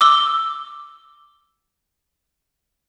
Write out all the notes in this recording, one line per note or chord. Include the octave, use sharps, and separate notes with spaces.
D6 E6 G7